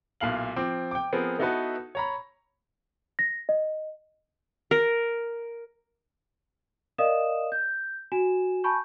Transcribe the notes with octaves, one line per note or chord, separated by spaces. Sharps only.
B1 A#2 E4 F5 F#7
F3 C4 D6
G5 D6
F3 B3 C4 G#4 A#4
B3 D#4 E4 F#4 A4 B4
C#5 A#5 B5
A#6
D#5
A#4
A#4 D5 D#5 F5 D#6 E7
G6
F#4 G#5 E7
G#5 A5 B5 C#6 G6